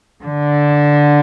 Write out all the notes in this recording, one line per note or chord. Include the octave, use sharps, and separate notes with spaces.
D3